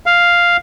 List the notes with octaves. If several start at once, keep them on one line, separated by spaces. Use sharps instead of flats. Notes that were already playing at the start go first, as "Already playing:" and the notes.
F5